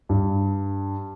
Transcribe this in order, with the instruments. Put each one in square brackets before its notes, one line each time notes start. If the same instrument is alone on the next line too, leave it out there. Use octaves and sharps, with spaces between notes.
[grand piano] G2